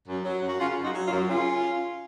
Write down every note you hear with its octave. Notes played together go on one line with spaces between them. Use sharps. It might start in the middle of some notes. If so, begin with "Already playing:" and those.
F#2
F#3
F#2
F#4
C#3 C#4 F4
F#2
D#4 F#4
F#3
C#4 F4
F#2
C#3 C#4 F4